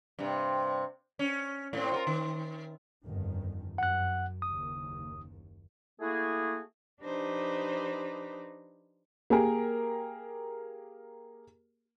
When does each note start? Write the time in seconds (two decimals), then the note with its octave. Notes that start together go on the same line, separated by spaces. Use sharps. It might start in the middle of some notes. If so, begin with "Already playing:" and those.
0.19 G2 C3
1.19 C#4
1.73 A2 C4
1.91 F4 F#4 A#4
2.07 D#3
3.03 G1 F2 D#3
3.78 F#2 F#5 F#6
4.42 F#1 D#2 D#6
6.00 A3 A#3 E4 F#4 G#4
7.01 F3 D4 D#4 G4 B4 C5
9.30 A#3 G4 G#4 A#4